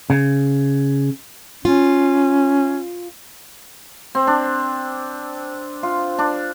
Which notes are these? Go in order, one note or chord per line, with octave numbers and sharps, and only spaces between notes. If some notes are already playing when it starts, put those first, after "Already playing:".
C#3
C#4 F4
C4
D4
F4
D4